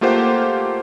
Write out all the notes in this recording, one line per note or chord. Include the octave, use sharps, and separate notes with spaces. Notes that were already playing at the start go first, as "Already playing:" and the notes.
A3 A#3 F4 G4 C5 F#5